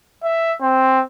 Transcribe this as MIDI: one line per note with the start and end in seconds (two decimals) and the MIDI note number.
0.24 0.53 76
0.61 1.01 60